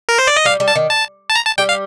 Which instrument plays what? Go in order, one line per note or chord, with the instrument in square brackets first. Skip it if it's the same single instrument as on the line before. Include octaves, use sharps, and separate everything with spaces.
[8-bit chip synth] A#4
C5
D5
D#5
[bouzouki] G3 [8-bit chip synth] F5
[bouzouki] G3
[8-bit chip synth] A5
[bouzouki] D#3
[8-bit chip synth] A5
A5
A#5
A5
[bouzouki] G3 [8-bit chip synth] G5
[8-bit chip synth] F5